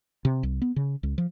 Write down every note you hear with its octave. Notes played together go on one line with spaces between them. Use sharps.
C3
C2
B3
C#3
C#2
F3